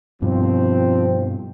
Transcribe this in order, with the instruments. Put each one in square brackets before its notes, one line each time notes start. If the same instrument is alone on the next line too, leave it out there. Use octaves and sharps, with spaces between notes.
[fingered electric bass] G2 B2 [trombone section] F3 C4